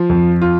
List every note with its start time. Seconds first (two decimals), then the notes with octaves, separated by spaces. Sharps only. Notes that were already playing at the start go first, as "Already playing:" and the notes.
Already playing: F3
0.10 F2
0.42 F4